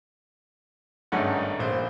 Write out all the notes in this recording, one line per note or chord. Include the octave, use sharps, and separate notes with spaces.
G#1 G2 A3 C#4 D#4 F#5
A#1 C5